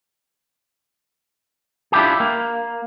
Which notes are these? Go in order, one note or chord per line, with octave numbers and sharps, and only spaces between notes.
D4 E4 F4 G4 G#4
A#3